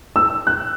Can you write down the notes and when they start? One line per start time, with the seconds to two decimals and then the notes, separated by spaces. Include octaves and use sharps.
0.16 E6
0.47 F#6